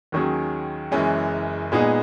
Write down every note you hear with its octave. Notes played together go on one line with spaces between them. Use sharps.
D#2 D#3 F#3 C#4 G#4
F#1 F#2 E3 G#3 C#4
A#2 G#3 B3 D#4 G#4